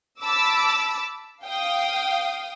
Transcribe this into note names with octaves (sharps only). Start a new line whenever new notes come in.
A5 B5 D6 E6
F5 G5 D#6